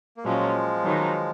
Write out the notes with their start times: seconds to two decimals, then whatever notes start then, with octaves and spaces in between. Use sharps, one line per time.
0.17 A#3
0.24 A#2 F3 F#3 G#3 C#4 F4
0.83 D#3 F#3 B3 D#4